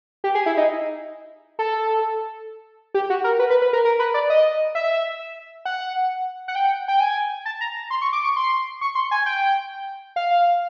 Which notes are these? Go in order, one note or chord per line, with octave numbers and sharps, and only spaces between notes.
G4
G#4
E4
D#4
A4
G4
F#4
A#4
B4
B4
B4
A#4
A#4
B4
D5
D#5
E5
F#5
F#5
G5
G5
G#5
A5
A#5
C6
C#6
D6
C#6
C6
C#6
C6
G#5
G5
F5